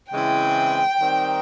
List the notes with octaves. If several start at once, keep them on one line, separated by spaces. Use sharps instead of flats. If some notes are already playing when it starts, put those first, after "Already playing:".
C#3 E3 G#3 C4 E4 G5
D#3 G3 C4 D#4